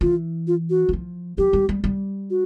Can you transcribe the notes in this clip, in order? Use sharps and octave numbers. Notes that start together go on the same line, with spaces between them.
E3 F4
F4
F#4
E3
F3
F#3 G4
G3
G3
G3
F#4